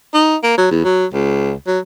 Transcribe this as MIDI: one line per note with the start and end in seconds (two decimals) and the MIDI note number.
0.14 0.36 63
0.43 0.53 58
0.58 0.69 54
0.71 0.84 40
0.84 1.06 54
1.13 1.54 37
1.67 1.79 54